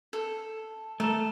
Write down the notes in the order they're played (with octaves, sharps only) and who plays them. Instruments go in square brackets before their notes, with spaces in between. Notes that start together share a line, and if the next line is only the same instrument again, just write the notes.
[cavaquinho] A4
[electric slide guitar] A3 A4 [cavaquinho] A#4